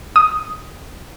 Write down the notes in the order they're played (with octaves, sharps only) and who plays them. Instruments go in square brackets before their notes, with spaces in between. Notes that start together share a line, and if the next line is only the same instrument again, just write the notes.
[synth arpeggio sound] D#6